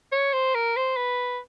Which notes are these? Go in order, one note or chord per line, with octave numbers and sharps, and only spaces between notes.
C#5
C5
A#4
C5
B4